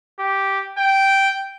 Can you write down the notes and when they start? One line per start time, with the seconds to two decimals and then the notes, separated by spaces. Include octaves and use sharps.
0.19 G4
0.78 G5